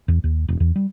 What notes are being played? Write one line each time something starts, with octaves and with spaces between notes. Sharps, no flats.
E2
D#2
E1
E2
G3